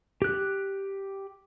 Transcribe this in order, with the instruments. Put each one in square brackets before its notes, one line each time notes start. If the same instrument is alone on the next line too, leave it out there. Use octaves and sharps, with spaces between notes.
[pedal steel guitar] G4 F#6